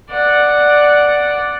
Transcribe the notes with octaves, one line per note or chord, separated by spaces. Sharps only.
D5 F#5